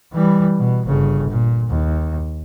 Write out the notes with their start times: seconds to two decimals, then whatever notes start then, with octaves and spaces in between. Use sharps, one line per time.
0.13 E3 G3
0.58 B2
0.87 G1 C#3
1.29 A#2
1.69 D#2